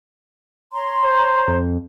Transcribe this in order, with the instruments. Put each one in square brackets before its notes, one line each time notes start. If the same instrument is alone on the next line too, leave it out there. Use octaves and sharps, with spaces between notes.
[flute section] C#5 A#5 C6
[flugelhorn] C5
[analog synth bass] F2